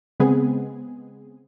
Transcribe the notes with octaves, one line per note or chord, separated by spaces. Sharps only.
C#3 G#3 B3 C4 G#4